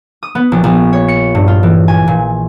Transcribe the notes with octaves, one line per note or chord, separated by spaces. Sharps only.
D#6
B3
A#1
A#1
C#5
C#7
G2
F4
E3
G#5
A#2